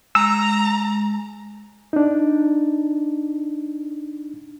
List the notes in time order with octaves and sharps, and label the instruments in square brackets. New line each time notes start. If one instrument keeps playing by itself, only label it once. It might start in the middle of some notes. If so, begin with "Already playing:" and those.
[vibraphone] G#3 [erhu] A#5 [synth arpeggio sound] E6
[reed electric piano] D4 D#4